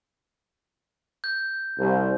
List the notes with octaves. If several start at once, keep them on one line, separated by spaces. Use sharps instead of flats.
G6
C2